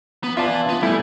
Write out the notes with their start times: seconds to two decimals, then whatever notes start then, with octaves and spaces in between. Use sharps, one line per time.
0.24 B3
0.37 F4 B4 D5 E5 A5
0.69 B3
0.83 G3 A3 E4 G#5